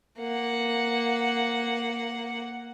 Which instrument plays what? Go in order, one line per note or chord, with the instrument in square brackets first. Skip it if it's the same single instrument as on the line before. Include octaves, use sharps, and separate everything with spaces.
[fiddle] A#3 F#5